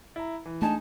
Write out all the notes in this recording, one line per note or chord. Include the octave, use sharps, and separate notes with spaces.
E4 A#5
E3
G#3 A3 D4 D#4 G#5 A5